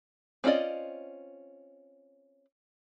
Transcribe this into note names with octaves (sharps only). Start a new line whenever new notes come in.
C4 C#4 F4 D5 D#5